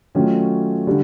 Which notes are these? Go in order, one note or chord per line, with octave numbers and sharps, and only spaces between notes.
D#3 F#3 A3 C#4 F4
D3 G3